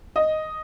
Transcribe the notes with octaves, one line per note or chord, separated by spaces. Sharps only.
D#5